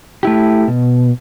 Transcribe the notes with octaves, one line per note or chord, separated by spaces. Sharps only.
A3 E4 G4
B2